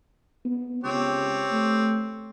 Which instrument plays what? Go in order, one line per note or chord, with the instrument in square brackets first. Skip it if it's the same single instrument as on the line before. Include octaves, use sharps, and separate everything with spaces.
[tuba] B3
[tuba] C#2 [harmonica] C4 G4 C#5
[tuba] A3